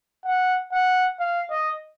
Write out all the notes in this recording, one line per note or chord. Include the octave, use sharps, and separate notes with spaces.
F#5
F#5
F5
D#5